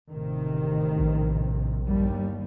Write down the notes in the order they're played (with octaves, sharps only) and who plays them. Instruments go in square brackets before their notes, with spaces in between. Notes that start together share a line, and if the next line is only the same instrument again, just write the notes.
[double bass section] A1 C3 D#3
[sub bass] A#1
[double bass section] G1 D#2 G3